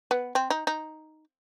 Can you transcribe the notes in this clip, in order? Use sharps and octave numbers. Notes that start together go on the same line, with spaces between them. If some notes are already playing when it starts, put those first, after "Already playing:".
B3
C4
D#4
D#4